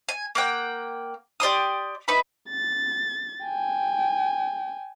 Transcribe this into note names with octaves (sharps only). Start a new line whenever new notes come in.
G#5
A#3 F#5 G5
G4 D5 C6 D#6
D#4 B4 E5 B5
A6
G5 G#5